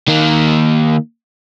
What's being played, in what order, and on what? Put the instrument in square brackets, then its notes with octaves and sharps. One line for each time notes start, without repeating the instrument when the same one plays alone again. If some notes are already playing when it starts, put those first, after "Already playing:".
[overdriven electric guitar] D#3 A#3